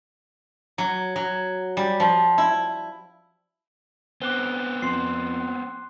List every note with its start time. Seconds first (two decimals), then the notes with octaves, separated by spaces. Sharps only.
0.78 F#3
1.16 F#3
1.77 G3
2.00 F3
2.38 E4
4.22 B3 C4 D6 F#6 G7
4.82 F2 C6 C7